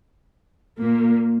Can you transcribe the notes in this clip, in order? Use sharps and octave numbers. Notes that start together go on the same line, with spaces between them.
A#2 A#3